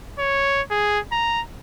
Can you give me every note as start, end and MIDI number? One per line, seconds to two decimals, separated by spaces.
0.19 0.62 73
0.71 0.99 68
1.12 1.42 82